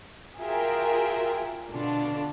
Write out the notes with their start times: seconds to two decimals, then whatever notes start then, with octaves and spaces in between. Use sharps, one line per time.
0.38 F4 F#4 G#4 A#4 E5 G5
1.71 B2 D3 D4 F4